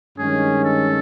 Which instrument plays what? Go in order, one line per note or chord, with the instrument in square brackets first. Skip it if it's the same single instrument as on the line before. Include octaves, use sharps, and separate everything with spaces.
[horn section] G2 D#3 G#3 C#4 [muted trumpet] G#4
[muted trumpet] A4